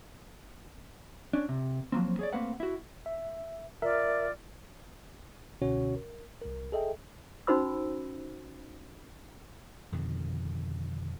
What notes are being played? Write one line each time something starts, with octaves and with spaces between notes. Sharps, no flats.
C#4 D4
C3
F3 F#3 A#3 C4
G#4 C#5 D5
A3 A#3 C4 B4 F5 F#5
E4 F#4
E5
F4 A#4 D5 E5
C#2 B2 D3 C#4 F#4 C#5
A#4
C2 A#4
G#4 A4 D#5 E5 G5
C#4 D#4 F#4 C5 B5 E6
F2 B2 D3 D#3